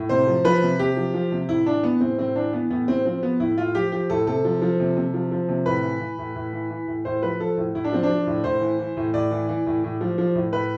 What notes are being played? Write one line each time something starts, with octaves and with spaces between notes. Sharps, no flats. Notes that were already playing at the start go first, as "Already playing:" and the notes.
Already playing: A2
C3 C5
F3
F3 B4
C3
C3 G4
F3
F3
C3
A2 E4
E3 D4
E3 B3
A2 C4
A2 C4
E3 D4
E3 B3
A2 B3
A2 C4
F3 C4
F3 B3
A2 E4
A2 F4
F3 G4
F3 G4
A2 A4
C3 A4
F3
F3
C3
C3
F3
F3
C3
A2 B4
E3
E3
A2
A2
E3
E3
A2
A2 C5
F3 B4
F3 A4
A2
A2 E4
D4
F3 C4
D4
F3
A2
A2 C5
E3
E3
A2
A2 D5
E3
E3
A2
A2
F3
F3
A2
A2 B4